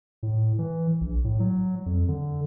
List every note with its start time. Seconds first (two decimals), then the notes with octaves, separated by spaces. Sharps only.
0.23 A2
0.59 E3
1.01 A#1
1.24 A2
1.40 F#3
1.86 F2
2.08 D3